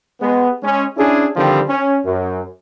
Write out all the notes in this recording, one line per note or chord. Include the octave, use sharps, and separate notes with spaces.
G#3 B3
G#3 C#4
C#4 D4 E4 G#4
D3 D#3 F3 G3 C4
C#4
F#2